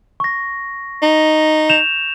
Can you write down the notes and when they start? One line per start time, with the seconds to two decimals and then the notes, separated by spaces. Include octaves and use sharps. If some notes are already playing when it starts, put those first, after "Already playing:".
0.20 C#6 A#6
1.02 D#4
1.69 G6 E7 F7